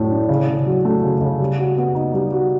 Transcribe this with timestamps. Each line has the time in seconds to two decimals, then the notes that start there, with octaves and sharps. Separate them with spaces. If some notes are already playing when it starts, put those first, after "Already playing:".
Already playing: A2 F#3 A3 D4
0.11 D4
0.29 C#3
0.48 C#3
0.66 F#3
0.85 A3
1.03 C#3
1.21 C#3
1.40 G3
1.59 F#4
1.77 B3
1.95 D#4
2.14 G3
2.32 F#4